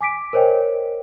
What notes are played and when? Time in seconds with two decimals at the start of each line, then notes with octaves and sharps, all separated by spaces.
0.01 G#5 D6 B6 D7
0.33 A#4 C5 C#5 D#5 G5